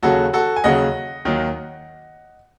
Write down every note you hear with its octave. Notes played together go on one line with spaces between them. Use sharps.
D#2 C#3 F#3 F#4 A4
F#4 A4
G#5
D#2 C#3 F#3 D#5 F#5
D#2 D#3 F#3